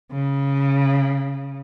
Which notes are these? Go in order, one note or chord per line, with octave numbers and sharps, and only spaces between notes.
C#3